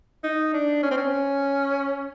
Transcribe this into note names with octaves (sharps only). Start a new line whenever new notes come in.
D#4
D4
C#4
C4
C#4